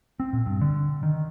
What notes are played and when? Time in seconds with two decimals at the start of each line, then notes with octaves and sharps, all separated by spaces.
0.20 C4
0.33 A#2
0.46 G2
0.61 D3
1.03 D#3